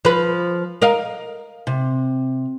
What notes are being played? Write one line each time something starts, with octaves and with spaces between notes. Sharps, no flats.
F3 B4
A#4 D#5 F5
C3